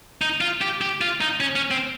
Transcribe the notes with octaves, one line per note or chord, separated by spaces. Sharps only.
D#4
F4
G4
G4
F4
D#4
C#4
C#4
C4